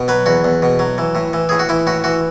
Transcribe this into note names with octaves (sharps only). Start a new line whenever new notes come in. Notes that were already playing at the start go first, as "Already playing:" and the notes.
Already playing: B2
F#3 B4
E2 F#4
E2
B2
F#3
E3
A2
E3
A2 G#4
F#4
E3 E4
A2 F#4
E3 F#4